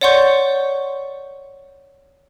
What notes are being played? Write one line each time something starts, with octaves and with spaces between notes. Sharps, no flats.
C#5 D5 F#5 C6 C#6 G6